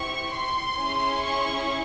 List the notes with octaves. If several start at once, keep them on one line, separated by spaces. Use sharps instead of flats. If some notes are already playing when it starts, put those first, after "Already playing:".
Already playing: C4 E4 G4 C#6
C6
C#4 E4 G#4
C#6